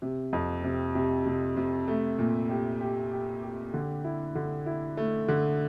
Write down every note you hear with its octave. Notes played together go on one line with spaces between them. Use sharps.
C3
F2
C3
C3
C3
C3
A3
A#2
G4
G4
G4
G4
D3
E4
D3
E4
A3
D3